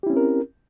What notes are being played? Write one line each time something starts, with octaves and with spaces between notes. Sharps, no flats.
C4 C#4 E4 G4 A#4